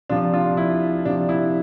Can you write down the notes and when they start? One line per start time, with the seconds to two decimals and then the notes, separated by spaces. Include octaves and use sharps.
0.09 C3 F3 D4 F4
0.34 D4 F4
0.57 E4
1.05 C3 F3 D4
1.29 E4